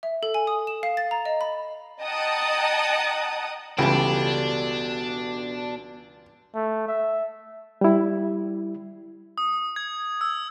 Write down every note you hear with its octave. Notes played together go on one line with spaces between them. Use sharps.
E5
A4
G#5
D#6
E7
F5
A6
A#5
D#5
B5
D#5 F#5 G5 A5 A#5 D#6
C#2 B2 E3 G3 D4 G4 A4
A3
E5
G3 E4
D#6
G#6
E6